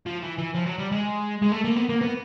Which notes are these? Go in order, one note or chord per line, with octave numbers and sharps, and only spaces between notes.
F3
E3
E3
F3
F#3
G3
G#3
G#3
A3
A#3
B3
A#3
B3